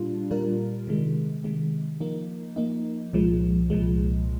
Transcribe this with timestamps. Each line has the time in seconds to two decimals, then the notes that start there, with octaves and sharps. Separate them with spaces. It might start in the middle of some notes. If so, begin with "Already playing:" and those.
Already playing: A#2 G3 D4 F4
0.31 A#2 G3 D4 F4 A#4
0.87 C3 D#3 G#3
1.44 C3 D#3 G#3
2.00 F3 A#3 D#4
2.56 F3 A#3 D#4
3.13 C2 A#2 F3 G#3
3.70 C2 A#2 F3 G#3